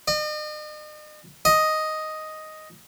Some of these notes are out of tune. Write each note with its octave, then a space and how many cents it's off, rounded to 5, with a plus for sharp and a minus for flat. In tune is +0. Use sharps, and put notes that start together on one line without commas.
D#5 -40
D#5 +5